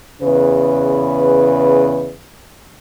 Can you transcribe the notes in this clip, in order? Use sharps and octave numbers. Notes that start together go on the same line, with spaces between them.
E2 C#3 B4